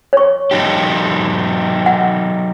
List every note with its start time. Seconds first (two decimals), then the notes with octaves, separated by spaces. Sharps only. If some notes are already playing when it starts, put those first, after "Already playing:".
0.13 C#5 C#6
0.51 F#3 D#4 G4
1.86 F#5